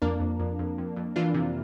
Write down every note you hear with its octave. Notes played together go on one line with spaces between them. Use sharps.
F2 A#3 D4
F2
F2
F2
F2
F2
E3 D4 F4
C3